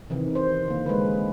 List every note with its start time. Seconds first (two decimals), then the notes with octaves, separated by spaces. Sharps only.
0.10 C3 D#3 E3
0.35 C5
0.68 D3 A#3
0.86 G#3 A#3 B4